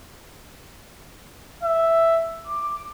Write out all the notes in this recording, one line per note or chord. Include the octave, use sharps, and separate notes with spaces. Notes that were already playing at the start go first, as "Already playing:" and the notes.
E5
D6